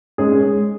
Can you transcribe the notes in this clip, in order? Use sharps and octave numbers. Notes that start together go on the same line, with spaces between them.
G#3 C#4 G#4